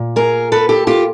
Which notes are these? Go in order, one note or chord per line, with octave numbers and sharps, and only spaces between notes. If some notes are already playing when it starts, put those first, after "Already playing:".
Already playing: A#2
G#4 A#4
A4 B4
G4 A4
F4 G4